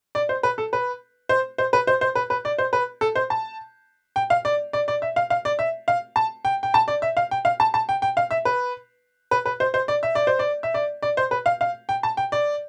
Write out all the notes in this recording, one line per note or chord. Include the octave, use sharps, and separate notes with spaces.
D5
C5
B4
A4
B4
C5
C5
B4
C5
C5
B4
B4
D5
C5
B4
A4
C5
A5
G5
F5
D5
D5
D5
E5
F5
F5
D5
E5
F5
A5
G5
G5
A5
D5
E5
F5
G5
F5
A5
A5
G5
G5
F5
E5
B4
B4
B4
C5
C5
D5
E5
D5
C5
D5
E5
D5
D5
C5
B4
F5
F5
G5
A5
G5
D5